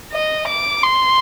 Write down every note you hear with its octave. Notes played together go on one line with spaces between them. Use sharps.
D#5
D6
C6